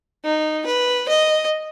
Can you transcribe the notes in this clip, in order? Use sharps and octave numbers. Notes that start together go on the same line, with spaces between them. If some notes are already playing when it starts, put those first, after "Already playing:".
D#4
B4
D#5